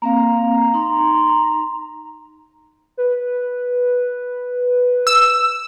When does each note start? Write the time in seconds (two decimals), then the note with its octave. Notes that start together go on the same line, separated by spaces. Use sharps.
0.02 A#3 C4 F5 A#5
0.74 D#4 C6
2.97 B4
5.07 E6